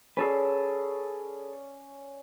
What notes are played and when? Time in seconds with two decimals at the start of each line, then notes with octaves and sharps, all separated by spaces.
0.17 C#4 G#4 A4 B4 D5